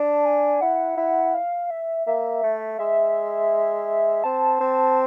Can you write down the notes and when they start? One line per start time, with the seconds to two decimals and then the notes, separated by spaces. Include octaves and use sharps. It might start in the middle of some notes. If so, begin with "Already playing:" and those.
Already playing: D4 A5
0.25 G#5
0.61 E4 F#5
0.97 E4
1.34 F5
1.70 E5
2.07 A#3 E5
2.43 A3
2.79 G#3 E5
4.24 C4 A5
4.60 C4